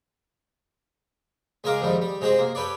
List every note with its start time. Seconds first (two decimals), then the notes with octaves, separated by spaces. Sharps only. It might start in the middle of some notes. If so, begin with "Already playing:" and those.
1.64 C#2 G#3 G#4 A#4 F5 D6
1.81 F2 G#2 D#3 G3
2.01 G3
2.21 C3 G#3 C4 F#4 G#4
2.39 A#3
2.55 G4 A4 B4 C#5 D5